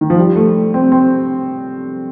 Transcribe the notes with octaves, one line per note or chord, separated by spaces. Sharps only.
D#3
F3
G3
A3
C4
C4